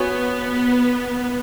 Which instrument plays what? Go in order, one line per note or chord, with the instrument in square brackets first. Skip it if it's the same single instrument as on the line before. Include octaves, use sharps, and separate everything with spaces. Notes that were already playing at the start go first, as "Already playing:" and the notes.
Already playing: [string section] B3 [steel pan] F#4 C#5 G#5 C#6